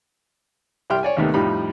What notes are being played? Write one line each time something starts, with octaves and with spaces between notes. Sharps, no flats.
C2 G3 E5 G5 C6 F6
C#5 D5 G#5
D#2 C3 D#3 A3 B3
F2 A2 F3 G3 D#4 B5